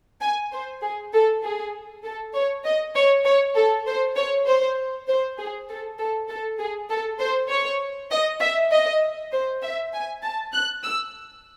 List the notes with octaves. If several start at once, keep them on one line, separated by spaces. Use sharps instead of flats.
G#5
C5
G#4
A4
G#4
A4
C#5
D#5
C#5
C#5
A4
C5
C#5
C5
C5
G#4
A4
A4
A4
G#4
A4
C5
C#5
D#5
E5
D#5
C5
E5
G#5
A5
F#6
E6